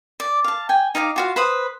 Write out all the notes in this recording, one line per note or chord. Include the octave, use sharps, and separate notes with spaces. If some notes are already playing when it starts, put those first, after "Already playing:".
D5
F5 A5
G5 G#5
D#4 F5 G#5 D6
F4 F#4 F5
B4 C5 B5 D#6